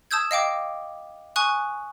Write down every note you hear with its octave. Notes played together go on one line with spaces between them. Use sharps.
A5 D#6 E6 G6 G#6
D#5 F5 G5 D6
G#5 C#6 D#6 F#6